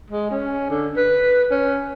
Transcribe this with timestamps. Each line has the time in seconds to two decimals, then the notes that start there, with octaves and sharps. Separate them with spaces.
0.10 G#3
0.31 C#4
0.70 D3
0.97 B4
1.51 C#4